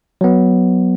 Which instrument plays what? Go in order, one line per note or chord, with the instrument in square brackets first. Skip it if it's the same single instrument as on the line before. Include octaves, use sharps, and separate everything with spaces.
[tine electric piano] F#3 B3